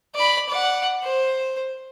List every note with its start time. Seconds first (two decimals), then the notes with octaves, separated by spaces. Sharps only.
0.15 D5 B5
0.49 D5 F#5
1.04 C5